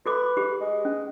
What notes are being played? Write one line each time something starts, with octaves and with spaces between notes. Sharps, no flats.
F#4 A4 B4 D6
G4 G#4
G#3
C#4